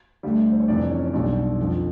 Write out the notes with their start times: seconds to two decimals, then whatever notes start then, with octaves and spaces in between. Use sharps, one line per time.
0.23 D2 D3 G3
0.52 C5
0.60 C#5
0.68 F2 C3 E3 D4 D5
0.91 C#4 C#5
1.06 C#5
1.13 B1 B2 G3 D4 D5
1.59 F2 D3 F3